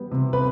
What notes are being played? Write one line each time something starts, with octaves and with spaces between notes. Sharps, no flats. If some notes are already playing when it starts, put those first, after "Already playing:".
Already playing: G3 B3
C3
B4